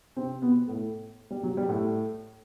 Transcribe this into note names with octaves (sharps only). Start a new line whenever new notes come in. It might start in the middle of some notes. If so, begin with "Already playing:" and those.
C3 C4
B2 B3
A2 A3
G3
F#3
G3
A2 A3